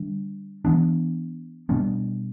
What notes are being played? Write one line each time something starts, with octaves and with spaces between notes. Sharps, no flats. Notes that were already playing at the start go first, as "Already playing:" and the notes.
Already playing: D3 G3 D4
E3 B3 D4
B2 G3 B3 D4